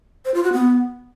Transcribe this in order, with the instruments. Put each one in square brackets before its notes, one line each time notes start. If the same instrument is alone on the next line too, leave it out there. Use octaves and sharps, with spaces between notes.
[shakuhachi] C5
F4
F#4
B3